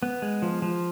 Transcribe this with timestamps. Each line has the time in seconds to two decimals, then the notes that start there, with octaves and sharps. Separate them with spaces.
0.03 B3
0.22 G#3
0.42 F3
0.62 F3